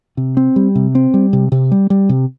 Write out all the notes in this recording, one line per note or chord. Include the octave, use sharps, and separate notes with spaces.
C3
C4
G3
C3
C4
G3
C3
C3
G3
G3
C3